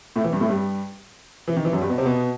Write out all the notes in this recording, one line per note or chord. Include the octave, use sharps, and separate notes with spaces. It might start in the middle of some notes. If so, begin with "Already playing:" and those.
A2 A3
E3
G2 G3
A2 A3
G2 G3
E3
D#3
E3
F#2 F#3
G2 G3
B2 B3
C3 C4
B2 B3